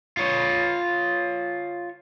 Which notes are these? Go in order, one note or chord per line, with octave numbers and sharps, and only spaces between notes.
F4 C#5